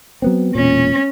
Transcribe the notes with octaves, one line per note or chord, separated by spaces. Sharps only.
F#3 B3 C4
E1 A#2 C#4